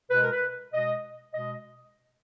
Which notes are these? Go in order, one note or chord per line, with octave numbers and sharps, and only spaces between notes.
B2 G#3 B4
A#4
B4
B2 G#3 D#5
B2 G#3 D#5